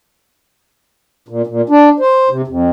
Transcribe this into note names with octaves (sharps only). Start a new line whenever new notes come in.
A#2
A#2
D4
C5
C3
F2